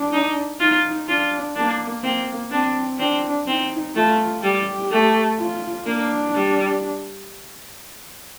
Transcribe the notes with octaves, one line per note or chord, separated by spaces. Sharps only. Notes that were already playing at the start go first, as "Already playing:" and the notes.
Already playing: D4
D#4
D#4 F4
D4 F4
A#3 D4
A#3 C4
C4 D4
C4 D4
C4 D#4
A3 F4
G3 G4
A3
F4
A#3 D4
G3